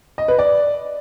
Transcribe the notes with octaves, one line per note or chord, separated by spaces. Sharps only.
D#5
B4
D5